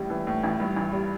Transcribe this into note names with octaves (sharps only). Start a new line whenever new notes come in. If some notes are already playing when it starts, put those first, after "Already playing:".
Already playing: A1 A2 G3
E3
A2
A1
G2
A1
G3